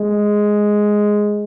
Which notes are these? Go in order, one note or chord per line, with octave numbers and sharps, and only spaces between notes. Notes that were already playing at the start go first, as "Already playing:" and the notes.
Already playing: G#3